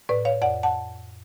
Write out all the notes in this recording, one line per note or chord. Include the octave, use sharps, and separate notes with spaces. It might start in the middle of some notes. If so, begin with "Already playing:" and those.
A2 B4 D5
C#5 F5
F2 D5 F#5
F#5 A5